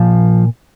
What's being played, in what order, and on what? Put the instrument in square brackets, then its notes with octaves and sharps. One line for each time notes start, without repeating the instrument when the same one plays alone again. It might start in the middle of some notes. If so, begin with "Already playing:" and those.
Already playing: [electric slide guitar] A#2 F3